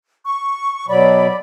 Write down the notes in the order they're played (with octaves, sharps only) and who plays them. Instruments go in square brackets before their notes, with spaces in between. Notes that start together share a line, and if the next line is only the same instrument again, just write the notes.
[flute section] C#6
[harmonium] B2 F#3 [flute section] D5 B5